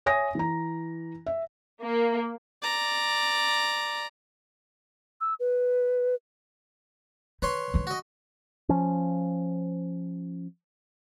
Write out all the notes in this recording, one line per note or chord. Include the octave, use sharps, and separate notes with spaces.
C#5 E5 G#5 D#6 A#6
E3 A#5
E5
A#3
D5 A#5
E6
B4
D#3 B4 C#5 C6
D3 G#3
F#4 D#5
F3 C#4